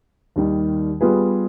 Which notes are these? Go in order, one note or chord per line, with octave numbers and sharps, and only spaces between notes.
D#2 D#3 G3
G3 B3 F4 G#4 B4